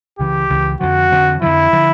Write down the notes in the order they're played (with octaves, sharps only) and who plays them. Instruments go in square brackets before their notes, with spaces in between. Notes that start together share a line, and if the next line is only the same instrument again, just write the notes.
[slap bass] C#2 C#3 E3 [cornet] G4
[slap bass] C#2 C#3 E3
[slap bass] F2 D3 F3 [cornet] F#4
[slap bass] F2 D3 F3
[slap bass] F2 D3 F3 [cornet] E4
[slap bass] D3 F3